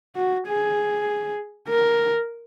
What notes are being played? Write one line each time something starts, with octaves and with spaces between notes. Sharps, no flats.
F#4
G#4
A#4